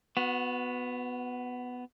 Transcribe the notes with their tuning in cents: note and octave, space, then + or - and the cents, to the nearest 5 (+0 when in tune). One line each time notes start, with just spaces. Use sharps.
B3 +10 F#4 -25